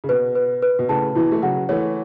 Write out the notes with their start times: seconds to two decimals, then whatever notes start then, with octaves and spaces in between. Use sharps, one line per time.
0.04 C#3
0.09 B2 B4
0.35 B4
0.62 B4
0.79 B2
0.89 A2 C#3 A5
1.15 B2 E3 E4
1.32 A3
1.42 C#3 F#3 F#5
1.69 E3 A3 C#5